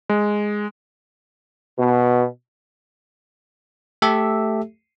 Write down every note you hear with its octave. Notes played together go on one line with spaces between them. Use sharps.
G#3
B2
A3 G4 A4 E5